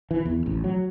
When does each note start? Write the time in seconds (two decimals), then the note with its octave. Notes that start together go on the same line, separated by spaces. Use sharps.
0.11 E3
0.25 E2
0.46 A1
0.64 F#3